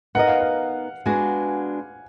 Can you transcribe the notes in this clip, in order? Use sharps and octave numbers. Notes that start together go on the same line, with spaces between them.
B3 D#4 A#4 D#5 F#5
F5
F#5
G#3 B3 D4 F#4 G#5